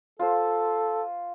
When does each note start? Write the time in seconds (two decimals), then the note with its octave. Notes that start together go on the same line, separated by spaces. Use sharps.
0.19 F4 A4 C5